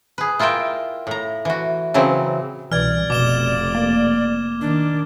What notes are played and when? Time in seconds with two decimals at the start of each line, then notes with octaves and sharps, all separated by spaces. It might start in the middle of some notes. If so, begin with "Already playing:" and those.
0.18 G#4 B4
0.39 E4 F4 A#4 E5 G5
1.07 A2 A#5
1.45 E3 F#4
1.94 C#3 E3 F#3 C4
2.72 C2 B2 E3 D5 F6 G#6
3.10 F1 B2 D6 E7 G7
3.75 A#3
4.61 D#3 D4